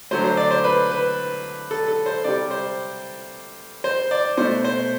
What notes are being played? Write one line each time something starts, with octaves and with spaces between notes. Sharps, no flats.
D3 F#3 A3 C5
C5
D5
C5
B4
B4
A4
A4
C5
C3 G3 D5
C5
C5
D5
B2 A3 C5
C5